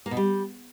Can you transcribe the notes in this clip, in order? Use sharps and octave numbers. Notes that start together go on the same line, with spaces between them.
A#3
B2
G3